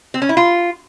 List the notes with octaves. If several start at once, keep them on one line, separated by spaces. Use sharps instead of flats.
C4
C#4
E4
F4